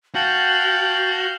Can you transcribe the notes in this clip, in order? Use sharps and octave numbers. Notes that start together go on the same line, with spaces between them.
F#4 F5 G5 A5 G6 F#7